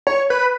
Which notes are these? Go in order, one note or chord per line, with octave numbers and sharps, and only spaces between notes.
C#5
B4